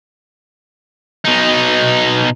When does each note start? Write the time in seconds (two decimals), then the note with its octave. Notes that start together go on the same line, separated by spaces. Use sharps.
1.25 B2 D#4